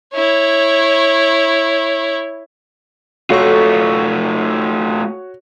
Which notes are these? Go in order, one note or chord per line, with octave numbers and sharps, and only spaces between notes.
E4 C#5
A3 F4 F#4 A4 C#5 C#6